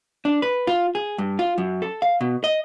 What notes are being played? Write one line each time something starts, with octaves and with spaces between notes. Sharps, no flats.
D4
B4
F4
G#4
G2
F4
F#2
A4
F5
B2
D#5